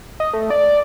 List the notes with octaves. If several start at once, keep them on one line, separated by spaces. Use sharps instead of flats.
D#5
A3
D5